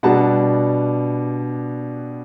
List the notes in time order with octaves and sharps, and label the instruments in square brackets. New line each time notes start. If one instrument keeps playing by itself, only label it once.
[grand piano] B2 G3 B3 D4 F#5 A5